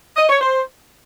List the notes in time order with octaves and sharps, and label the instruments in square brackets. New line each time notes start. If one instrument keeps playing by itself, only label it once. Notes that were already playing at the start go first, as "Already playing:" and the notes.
[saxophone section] D#5
C#5
C5